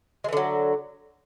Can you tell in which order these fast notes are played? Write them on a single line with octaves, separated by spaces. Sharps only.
G#3 E3 D3 F#3